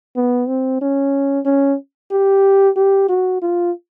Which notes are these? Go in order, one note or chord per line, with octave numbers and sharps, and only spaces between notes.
B3
C4
C#4
C#4
G4
G4
F#4
F4